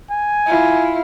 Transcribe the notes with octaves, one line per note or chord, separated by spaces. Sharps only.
G#5
E4 F4